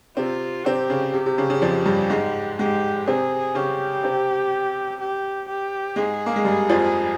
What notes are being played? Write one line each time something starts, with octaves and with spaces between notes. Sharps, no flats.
C3 C4 F4
C3 C4 G4
C#3
C3 G4
C3
C#3
C#3
F2 F3
G2 G3
G#2 G#3
G#2 G#3 G4
C3 C4 G#4
C#3 C#4 G4
C3 C4
G4
G4
G#2 G#3 G#4
A#3
G#3
G2 G3
F2 F3